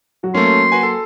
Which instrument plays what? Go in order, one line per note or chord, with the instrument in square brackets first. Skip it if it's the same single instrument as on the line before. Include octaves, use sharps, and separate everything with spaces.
[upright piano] F#3 F#4
[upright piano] F#3 A#3 [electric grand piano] A3 C#4 [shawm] C6
[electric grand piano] F#4 B4 G#5
A4